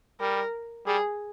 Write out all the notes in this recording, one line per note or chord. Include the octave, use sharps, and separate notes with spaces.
G3 A#4
G3 G#4